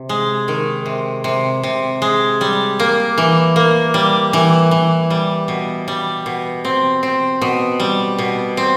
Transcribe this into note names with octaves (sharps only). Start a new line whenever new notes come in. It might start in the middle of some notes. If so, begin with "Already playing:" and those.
Already playing: C3
G#3
D#3
C3
C3
C3
G#3
G3
A#3
E3
A#3
G3
E3
E3
G3
B2
G3
B2
C4
C4
B2
G3
B2
C4